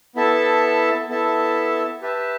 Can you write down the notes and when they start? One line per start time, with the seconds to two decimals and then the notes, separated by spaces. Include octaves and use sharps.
0.16 B3 E4 A4 E5 A5
1.08 B3 E4 A4 E5 A5
2.02 G4 B4 E5 A5